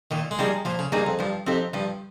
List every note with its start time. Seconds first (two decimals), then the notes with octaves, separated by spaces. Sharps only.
0.11 A#2 D#3
0.31 G#3
0.38 F3 G3 A#3 D#4 G#4
0.65 A#2 F3
0.79 C#3
0.92 G2 F3 A#3 D#4 G#4
1.07 F2
1.19 G2 F3
1.46 F2 C4 D#4 G4
1.74 G2 F3